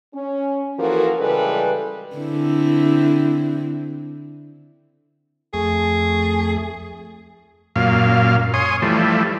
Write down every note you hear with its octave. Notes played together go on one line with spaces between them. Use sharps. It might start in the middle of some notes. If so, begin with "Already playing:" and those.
C#4
E3 F3 A#3 F#4 A4 A#4
C#3 E3 G3 G#3 A4 B4
D3 C4 E4
F2 A3 G#4
F#2 A#2 F5
C#5 G#5 C6 D#6
E3 F3 G3 A3